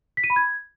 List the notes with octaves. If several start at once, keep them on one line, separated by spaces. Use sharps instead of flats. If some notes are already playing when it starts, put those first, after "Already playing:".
B6
D#7
B5
G#6